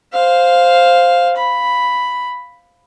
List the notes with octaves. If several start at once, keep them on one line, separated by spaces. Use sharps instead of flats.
C5 F5
B5